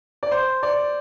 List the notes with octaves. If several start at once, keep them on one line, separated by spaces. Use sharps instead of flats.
D5
C5
D5